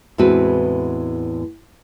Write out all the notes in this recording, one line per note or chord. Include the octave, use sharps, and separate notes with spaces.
E2 A2 G#3 C4 F#4 B4